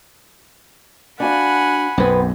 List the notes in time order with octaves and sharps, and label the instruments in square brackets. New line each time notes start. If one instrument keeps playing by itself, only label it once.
[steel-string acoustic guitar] D4 F#4 F5 [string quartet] F#5 G#5 B5
[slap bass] B1 F#2 [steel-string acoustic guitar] B3 C4